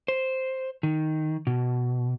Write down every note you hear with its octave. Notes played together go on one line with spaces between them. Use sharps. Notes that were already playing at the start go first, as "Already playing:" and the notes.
C5
D#3
B2